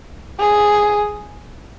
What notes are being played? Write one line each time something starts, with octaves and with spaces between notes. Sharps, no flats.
G#4